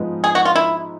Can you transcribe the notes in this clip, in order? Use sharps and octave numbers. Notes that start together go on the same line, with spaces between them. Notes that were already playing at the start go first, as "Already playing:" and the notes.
Already playing: G#2 F3 G#3 B3 D#4
G#4
F#4
F4
E4